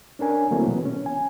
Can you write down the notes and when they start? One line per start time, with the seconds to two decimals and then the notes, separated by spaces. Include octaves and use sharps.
0.19 C#4 D4 A#4 G#5
0.51 D3 F#3 A3 A#3 C4 E4
0.68 B2 E3 B3
0.86 C#4
1.06 G#5